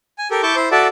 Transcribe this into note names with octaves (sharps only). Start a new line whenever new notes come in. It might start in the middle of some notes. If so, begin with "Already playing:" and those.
G#5
G4 A4 A#4
E4 A5 C#6 D6 G6
E4 C5
F#4 A4 D5 E5 A5